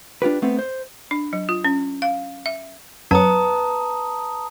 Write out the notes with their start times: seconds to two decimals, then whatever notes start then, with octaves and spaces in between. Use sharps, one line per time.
0.22 D4 F4 G4 B4
0.42 A3 B3 C4
0.59 C5
1.11 D4
1.33 F#3
1.49 F4
1.65 C#4
2.02 F5
2.46 E5
3.11 F#2 B3 A5 A#5 C#6 D#6